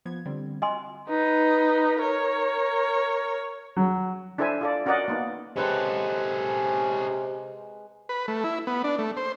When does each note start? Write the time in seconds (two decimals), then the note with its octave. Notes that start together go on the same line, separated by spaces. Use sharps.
0.06 F3 B3 G#6
0.26 D3 G3 C4
0.62 F4 F#4 D#5 G#5 C6
1.09 D#4 B4
2.01 A#4 C#5
3.77 F#3
4.38 D4 E4 A4 C5 E5 G#5
4.61 F4 A4 D5
4.86 C#4 F#4 A#4 D5 D#5 F#5
5.08 A#3 B3 D#4
5.56 C3 G#3 C#4 A4 B4 G5
8.09 B4
8.28 A3
8.44 E4
8.67 B3
8.84 D4
8.98 A3
9.17 C5